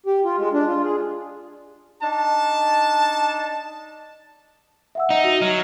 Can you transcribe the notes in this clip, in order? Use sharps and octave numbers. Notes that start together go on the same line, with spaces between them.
G4
F4
G#3
D4
F4
G#4
D4 D#4 A5
E5 F#5 E6
D#4
F#4
F#3 F6